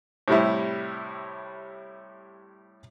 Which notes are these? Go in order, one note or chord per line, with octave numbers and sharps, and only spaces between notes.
A2 C3 G3 E4